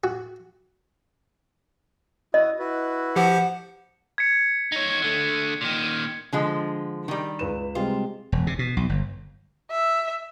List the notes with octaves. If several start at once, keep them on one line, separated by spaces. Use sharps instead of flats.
F#4
E4 F#4 D#5 D#6
E4 F#4 B4
F3 G4 C5 F#5
G#6 B6 C#7
D#4 C#5
D3 A3
A#2 D#3
D3 F3 G#3
D#3 G3
C#2 B4 E7
C3 G3 G#3 F4
E1
C3
B2
B1
G1
E5